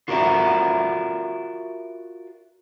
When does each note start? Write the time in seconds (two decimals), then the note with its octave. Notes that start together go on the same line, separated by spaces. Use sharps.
0.08 F4 F#4 A#4 B4 D5 E5